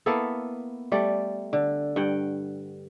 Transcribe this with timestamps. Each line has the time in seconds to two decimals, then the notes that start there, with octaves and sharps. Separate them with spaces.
0.06 A#3 B3 E4 A4
0.92 G3 A3 D5
1.53 D3
1.96 G2 F#5 G5